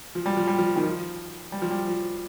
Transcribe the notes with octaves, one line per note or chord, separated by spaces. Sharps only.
F3
G3
F3
G3
F3
D#3
F3
G3
F3
G3
F3